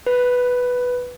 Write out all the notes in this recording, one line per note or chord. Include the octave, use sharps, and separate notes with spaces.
B4